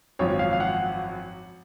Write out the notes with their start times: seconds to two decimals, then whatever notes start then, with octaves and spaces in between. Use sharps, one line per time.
0.19 G#1 F#2 F3 C#5
0.39 F5
0.53 F5
0.60 F#5